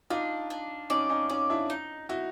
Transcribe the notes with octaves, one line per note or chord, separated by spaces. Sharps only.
D4 D#4 F4
D4
C#4 D#4 D5
C#4 D#4
C#4 D#4 D5
D4 E4
D#4
D#4 E4 F#4